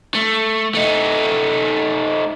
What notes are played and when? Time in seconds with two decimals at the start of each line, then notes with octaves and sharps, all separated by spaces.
0.15 A3
0.74 A3 D#4